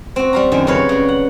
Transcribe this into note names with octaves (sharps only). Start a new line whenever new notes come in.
C4 F#4
G3 F5 A#5
F#2 D3 D#3 F3 A3 C5
C#3 F#3 G3 B4 C#5 F5
C#3 F#4
F#5